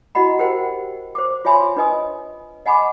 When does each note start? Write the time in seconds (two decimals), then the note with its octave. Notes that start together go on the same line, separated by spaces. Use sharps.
0.15 E4 F#4 D#5 F#5 B5
0.39 G4 A#4 C5 F#5 G5
1.15 C5 D6
1.45 F4 C#5 E5 G#5 B5 C6
1.77 D4 B4 D#5 G#5 D#6
2.66 D#5 F#5 G#5 B5 C#6 D6